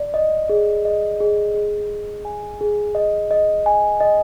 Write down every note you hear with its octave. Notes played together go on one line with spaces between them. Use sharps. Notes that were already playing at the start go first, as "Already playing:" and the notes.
Already playing: D5
D#5
G#4
D#5
G#4
G#4
G#4
G#5
G#4
D#5
D#5
G#5
D#5